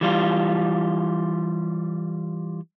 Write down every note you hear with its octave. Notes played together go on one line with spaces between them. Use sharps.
E3 G3 F4